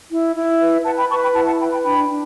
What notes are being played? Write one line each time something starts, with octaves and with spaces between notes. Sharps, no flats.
E4
E4
B4
B4 F#5 A5
G5 B5
B4 A5 C#6
G5 B5
E4 F#5 A5
F#5 A5
B4 G5 B5
G5 B5
D4 G5 B5
D4